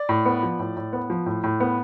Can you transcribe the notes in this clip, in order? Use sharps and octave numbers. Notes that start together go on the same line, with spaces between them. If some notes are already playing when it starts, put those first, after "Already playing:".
Already playing: D5
A2
B3
F3
A2
A2
B3
F3
A2
A2
B3